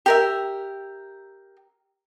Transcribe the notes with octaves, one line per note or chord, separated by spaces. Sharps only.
G4 A#4 E5